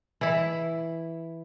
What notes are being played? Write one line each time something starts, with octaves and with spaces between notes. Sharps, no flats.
E3 E4